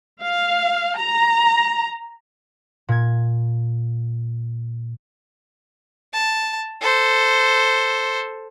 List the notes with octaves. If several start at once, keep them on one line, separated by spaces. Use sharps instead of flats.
F5
A#5
A#2 G#6
A5
A4 C5